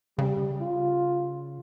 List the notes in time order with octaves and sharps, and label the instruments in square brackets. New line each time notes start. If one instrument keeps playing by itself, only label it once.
[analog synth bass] C#3 [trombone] G3
[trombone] F4